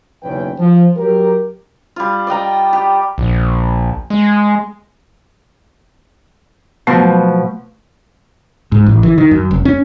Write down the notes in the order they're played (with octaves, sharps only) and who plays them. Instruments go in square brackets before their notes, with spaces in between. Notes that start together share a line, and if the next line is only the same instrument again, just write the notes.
[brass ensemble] F#1 B1 E2 C#4 B4 G5
F3
F#3 G4 A#4
[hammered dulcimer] G3 F4
D5 D#5 G5 A#5
G4
[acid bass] A#1
G#3
[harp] B2 F3 [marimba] F#3 A3
[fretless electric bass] G#2
A1
E3
D#3
F#2
F1
C#4